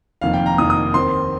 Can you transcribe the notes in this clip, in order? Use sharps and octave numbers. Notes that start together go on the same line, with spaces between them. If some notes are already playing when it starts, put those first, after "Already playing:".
F1 F2 D#3 A#3 F5
G5
A#5
F1 F2 D#3 A#3 D#6
D#6
D#2 D#3 C4 C6